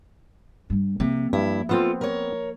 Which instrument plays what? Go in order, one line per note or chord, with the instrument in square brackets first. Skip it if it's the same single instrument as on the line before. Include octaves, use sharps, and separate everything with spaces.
[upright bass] G2 G3
[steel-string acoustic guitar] C3 [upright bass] F3 A#3
[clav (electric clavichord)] G2 [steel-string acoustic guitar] E4
[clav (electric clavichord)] B3 C4 [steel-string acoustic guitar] F4 A4
[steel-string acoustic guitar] A#4 C#5